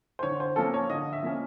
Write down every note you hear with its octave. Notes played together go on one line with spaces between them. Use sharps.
C5
D3 C#5
C5
F3 A#3 C#4 A4
C#5
D3 D#5
E5
F3 A#3 C#4